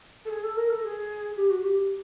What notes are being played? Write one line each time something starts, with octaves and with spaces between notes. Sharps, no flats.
A4
G#4
A4
A#4
A4
G#4
G4
F#4
G4